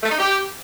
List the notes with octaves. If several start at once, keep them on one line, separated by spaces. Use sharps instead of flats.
A3
D#4
G4